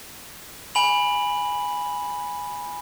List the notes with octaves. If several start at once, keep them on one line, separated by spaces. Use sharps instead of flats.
G#5 B5 F#7